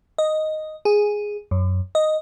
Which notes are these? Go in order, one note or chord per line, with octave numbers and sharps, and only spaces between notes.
D#5
G#4
F#2
D#5